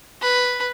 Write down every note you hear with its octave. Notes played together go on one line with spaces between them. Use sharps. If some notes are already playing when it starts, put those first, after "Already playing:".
B4